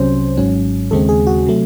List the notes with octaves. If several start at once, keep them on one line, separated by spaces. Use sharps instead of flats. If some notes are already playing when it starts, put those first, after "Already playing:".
Already playing: C2 C3 F#3 C#4 C5
G#1 G#2 F#3 C#4
D#2 C#3 G#3 C4 A4
G#4
F#4
C3 F#3 A3